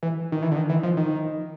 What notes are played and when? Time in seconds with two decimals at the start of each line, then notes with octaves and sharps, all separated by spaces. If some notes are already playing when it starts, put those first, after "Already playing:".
0.03 E3
0.32 D#3
0.42 E3
0.51 D3
0.56 D#3
0.69 E3
0.83 F3
0.97 D#3